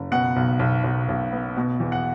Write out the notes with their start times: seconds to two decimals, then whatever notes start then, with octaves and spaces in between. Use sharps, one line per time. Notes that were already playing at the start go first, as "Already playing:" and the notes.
Already playing: F#1
0.12 B2 F#5
0.36 B1
0.59 B1
0.84 B1
1.08 B1
1.33 B3
1.57 B2
1.80 E2
1.92 F#5